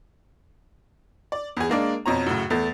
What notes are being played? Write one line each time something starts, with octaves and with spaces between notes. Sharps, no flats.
D5
E2 G#4
G#3 A#3 D4
F2 B2 C#5 A#5
F#2 A2 C#3
E2 A3 A6